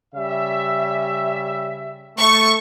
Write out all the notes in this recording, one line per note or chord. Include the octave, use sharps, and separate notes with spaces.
C#3 G3 E5
A3 C#6